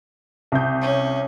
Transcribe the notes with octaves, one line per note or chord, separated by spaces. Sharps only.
C2 G6
C#4